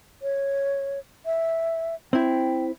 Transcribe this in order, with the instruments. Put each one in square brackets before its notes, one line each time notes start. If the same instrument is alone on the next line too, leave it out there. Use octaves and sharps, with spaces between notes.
[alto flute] C#5
E5
[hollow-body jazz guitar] C4 E4 [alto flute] G5